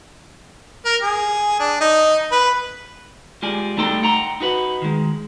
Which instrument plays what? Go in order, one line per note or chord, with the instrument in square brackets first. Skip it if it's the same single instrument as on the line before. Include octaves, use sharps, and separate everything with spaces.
[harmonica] A#4
G#4
D4
D#4
B4
[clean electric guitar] G#3 F4 G4 D5 G#5
G3 A3 D#4 A4 G5 C6
F#5 G5 A#5 C6
D#4 F#4 B4 F#5
D#3 G#3